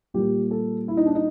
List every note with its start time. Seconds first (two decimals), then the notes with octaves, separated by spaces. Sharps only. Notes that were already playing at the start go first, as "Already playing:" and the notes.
0.14 A#2 G3 A#3 G4
0.51 A4
0.88 E4
0.97 D#4
1.06 D4
1.15 D#4